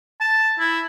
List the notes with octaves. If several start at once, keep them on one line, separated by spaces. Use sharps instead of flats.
A5
E4